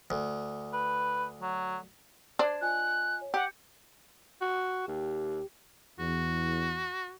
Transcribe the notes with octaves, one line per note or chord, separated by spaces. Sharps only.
D2
B4
F#3
D4 C5 G#6 E7
F4 D#5 G#5 F#6
C#5
G4 F#5 G6 C#7
F#4
D#2 G4
E2 F#4